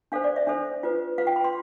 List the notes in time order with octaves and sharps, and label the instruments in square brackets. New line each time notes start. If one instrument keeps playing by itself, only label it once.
[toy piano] D4 A4 C5 F5
D5
E5
D4 A4 C5
F4 B4
F4 B4 F5
G5
B5
C6